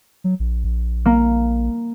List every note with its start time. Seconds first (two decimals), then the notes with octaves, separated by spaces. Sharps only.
0.24 F#3
0.40 A#1
0.64 A#1
1.06 A#3